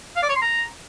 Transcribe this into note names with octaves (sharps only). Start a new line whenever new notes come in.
F5
D5
C#5
C6
A#5